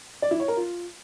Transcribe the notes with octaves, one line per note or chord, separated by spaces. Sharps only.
D5
E4
C#5
A#4
F4